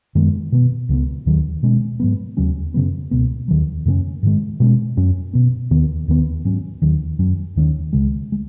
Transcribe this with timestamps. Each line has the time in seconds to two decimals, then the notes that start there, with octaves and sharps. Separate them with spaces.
0.15 F#2 D#3 G#3 B3
0.52 B2 B3
0.89 C#2 C#3 G#3 B3
1.26 D#2 D#3 F#3
1.63 B2 G#3 C#4
2.00 G#2 F#3 B3
2.37 D#2 C#3 F#3 C#4
2.74 F#2 C#3 F#3 B3
3.11 C#2 B2 B3
3.48 D#2 D#3 F#3
3.85 F#2 C#3 G#3 C#4
4.23 G#2 D#3 G#3
4.60 B2 G#3 C#4
4.97 F#2 F#3 C#4
5.33 B2 B3
5.71 D#2 D#3 B3
6.08 D#2 D#3 B3
6.45 G#2 F#3 C#4
6.82 D#2 D#3 F#3
7.19 F#2 F#3 C#4
7.56 D#2 D#3 G#3 C#4
7.93 C#2 C#3 G#3
8.32 G#3